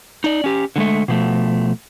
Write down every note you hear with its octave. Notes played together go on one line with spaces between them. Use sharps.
D#4 D5
C#4 G4
D3 G#3 A3
B2 F3 A3